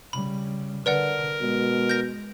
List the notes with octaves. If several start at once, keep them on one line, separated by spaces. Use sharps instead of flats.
C#3 G3 B5
D3 A#4 B4 D5 F#5
B2 G#3
G6 A#6